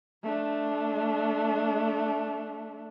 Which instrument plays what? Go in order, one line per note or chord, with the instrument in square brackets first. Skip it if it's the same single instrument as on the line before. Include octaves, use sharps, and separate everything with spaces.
[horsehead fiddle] A3 D4